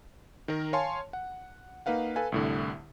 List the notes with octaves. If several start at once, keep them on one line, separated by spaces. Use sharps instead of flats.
D#3 A#4
C#5 F5 G#5 A5 C6
F#5
A#3 D#4 B4 F5 F#5
A4 B4 F5 G#5
C2 A2 D3